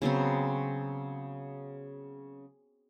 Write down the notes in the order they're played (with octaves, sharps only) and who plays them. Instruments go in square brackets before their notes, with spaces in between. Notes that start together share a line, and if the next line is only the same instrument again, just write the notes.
[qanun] C#3 F#3 B3 C4